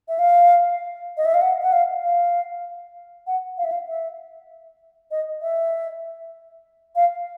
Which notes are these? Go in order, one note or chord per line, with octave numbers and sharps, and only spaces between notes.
E5
F5
D#5
E5
F5
F#5
F#5
F5
F5
F#5
F5
E5
F5
E5
D#5
E5
F5